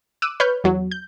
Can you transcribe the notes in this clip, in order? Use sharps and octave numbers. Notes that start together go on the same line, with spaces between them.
D6 E6 F#6 D#7
B4 C#5 F6 G6
E2 F#3
G6